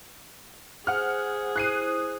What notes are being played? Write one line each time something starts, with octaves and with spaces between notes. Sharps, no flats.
G#4 C5 F#5 F6
E4 C5 D#6 F#6 C7 D#7